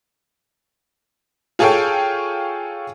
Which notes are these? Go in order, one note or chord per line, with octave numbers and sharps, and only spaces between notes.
F4 G#4 A4 C#5 F5 G5